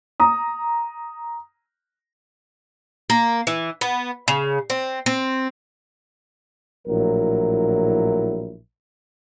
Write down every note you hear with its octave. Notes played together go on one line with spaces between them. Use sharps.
A#5 D#6
A#3
E3
B3
C#3
C4
C4
A#1 A2 F#3 E4 A#4